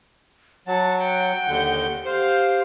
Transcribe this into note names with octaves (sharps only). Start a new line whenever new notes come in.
F#3 F#5 A5
G5
D#2 D3 G6
G4 C5 F5